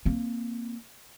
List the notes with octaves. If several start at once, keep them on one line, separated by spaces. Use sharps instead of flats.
A#3 C4